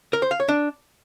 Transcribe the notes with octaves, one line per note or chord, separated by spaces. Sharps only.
A#4
C5
F5
C#5
D4